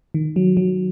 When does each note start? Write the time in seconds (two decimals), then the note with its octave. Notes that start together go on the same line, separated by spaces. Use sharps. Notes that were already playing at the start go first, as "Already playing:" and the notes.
0.14 D#3
0.36 F#3
0.57 F#3